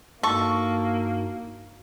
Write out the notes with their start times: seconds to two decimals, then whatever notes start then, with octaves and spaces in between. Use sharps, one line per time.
0.23 G2 A#3 D#4 F#4 A4 C#6